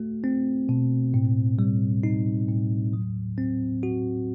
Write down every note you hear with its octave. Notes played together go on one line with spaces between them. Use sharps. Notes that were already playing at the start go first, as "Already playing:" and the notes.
Already playing: A3 F#4
C4
B2
A2
G3
D#4
A2
F#3
C4
F#4